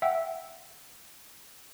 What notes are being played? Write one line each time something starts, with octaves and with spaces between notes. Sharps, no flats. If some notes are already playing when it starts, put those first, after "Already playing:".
E5 F#5 G5 E6